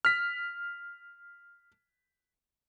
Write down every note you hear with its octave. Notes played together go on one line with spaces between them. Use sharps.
F6 B6